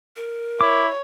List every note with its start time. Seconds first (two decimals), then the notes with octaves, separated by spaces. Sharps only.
0.16 A#4
0.61 E4 C#5 D6